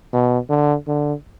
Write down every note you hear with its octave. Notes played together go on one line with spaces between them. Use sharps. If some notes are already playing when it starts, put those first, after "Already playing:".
B2
D3
D3